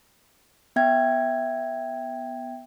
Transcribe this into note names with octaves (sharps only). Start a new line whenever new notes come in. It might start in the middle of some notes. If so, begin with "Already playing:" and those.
B3 E5 G5 G#6